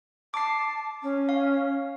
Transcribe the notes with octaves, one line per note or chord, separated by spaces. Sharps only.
A5 D6 C7
C#4
F5